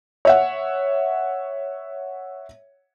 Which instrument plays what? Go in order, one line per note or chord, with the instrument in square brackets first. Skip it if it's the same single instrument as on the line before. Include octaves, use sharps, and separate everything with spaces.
[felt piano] C#5 E5 F#5